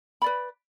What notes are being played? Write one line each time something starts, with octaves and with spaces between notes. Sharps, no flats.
B4 D5 B5